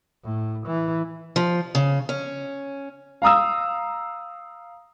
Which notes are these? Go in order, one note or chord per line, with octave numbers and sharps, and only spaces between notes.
A2
E3
F3
C#3
C#4
F5 A#5 D#6 E6